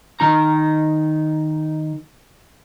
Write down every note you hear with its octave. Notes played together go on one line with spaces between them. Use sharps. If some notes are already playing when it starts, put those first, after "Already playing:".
D#3 D#4 A#5